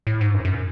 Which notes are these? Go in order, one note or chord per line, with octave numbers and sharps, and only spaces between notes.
A2
G#2
F#2
F#2